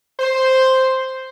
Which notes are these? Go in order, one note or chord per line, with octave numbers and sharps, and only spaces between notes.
C5